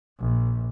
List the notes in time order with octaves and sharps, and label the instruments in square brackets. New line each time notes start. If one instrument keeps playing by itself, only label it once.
[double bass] A#1